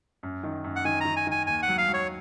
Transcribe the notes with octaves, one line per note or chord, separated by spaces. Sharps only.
F#2
D#3
F#2
F#5
D#3 G#5
D#3 A#5
G#5
D#3 G#5
D#2 G#5
F#5
F#3
F5
F#3
C#5